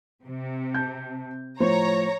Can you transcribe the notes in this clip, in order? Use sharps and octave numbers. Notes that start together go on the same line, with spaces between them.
C3
A5 G6
A2 F3 C5 C#5 A#5